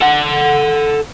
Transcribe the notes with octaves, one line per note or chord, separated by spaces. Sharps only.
A4 F#5